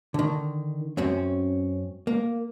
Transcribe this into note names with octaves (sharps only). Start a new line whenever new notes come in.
D3 D#3
F#2 C4 C#4
A#3